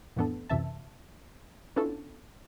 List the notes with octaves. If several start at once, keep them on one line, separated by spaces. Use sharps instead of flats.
F2 A2 E3 B3 D4 A4
C#2 F#2 C3 E3 E5 A5
B3 C#4 D4 E4 F4 A4